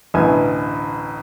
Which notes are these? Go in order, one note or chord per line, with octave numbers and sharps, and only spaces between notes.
A1 D2 B2 E3 G#5